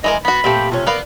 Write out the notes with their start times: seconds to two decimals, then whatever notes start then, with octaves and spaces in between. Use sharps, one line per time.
0.04 E3 G#3 A#4 D#5
0.25 B3 F#4 B5
0.44 A#2 A3 C4 G4 G5
0.71 C3 C#4 F4
0.86 B3 A#4 B4 D5 F5